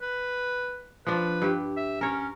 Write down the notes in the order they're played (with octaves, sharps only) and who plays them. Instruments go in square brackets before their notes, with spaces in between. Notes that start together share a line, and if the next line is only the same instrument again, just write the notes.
[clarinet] B4
[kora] F3 D4 [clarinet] B4
[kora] G2 G4
[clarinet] E5
[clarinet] C#4 [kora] A#4 C#5